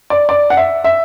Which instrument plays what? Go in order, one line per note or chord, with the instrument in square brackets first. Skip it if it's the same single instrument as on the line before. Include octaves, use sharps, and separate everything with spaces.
[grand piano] D5
D5
F#5
E5
E5